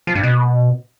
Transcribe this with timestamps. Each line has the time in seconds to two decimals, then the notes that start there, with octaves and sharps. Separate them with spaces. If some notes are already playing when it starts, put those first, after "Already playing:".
0.07 F3
0.15 G2
0.23 B2